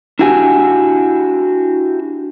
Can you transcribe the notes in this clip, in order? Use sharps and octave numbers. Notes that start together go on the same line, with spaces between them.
D4 E4 F#4 G4 G#5